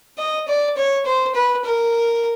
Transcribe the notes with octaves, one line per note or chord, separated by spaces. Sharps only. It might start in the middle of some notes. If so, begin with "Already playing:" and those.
D#5
D5
C#5
C5
B4
A#4